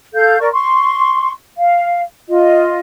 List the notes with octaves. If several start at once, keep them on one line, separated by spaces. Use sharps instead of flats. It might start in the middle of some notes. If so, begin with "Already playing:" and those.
A4 F5 G6
A#4 D5 C#6
C6 C#6
F5
F4 D#5